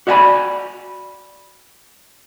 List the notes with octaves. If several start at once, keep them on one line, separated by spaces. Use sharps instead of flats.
F#4 D5 E5 F5 G#5 B5